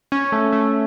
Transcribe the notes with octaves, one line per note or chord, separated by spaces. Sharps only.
C#4
A3
A3